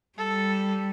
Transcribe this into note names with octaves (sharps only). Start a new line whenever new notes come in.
G3 A4